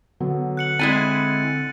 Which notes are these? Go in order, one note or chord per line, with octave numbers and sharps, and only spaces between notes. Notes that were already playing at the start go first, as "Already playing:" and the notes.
D3 F#3 B3
F#6 C#7 F#7
G#3 C4 E4 G#5 A6 D#7